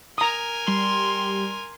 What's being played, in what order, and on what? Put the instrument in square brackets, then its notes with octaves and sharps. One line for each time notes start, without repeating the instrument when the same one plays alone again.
[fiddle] A#4 G#5 [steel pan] A#5 D#6
[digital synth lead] G3 [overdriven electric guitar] C6